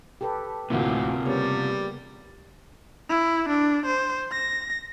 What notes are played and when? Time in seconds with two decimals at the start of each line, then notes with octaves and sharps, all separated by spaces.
0.21 G4 A4 B4
0.70 D2 A2 C3 A#3 F4
1.25 C#3 G3 A#3 B3 C#5
3.10 E4
3.49 D4
3.86 C5
4.32 A#6